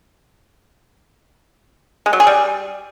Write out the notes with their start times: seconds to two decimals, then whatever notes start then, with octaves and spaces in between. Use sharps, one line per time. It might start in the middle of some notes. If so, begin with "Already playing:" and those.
2.06 G#3
2.13 F#3
2.20 G#4
2.27 G3